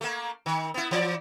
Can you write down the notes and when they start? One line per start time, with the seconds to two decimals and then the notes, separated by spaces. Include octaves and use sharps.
0.01 A3 A#3
0.46 D#3
0.74 B3 E4
0.91 E3 D5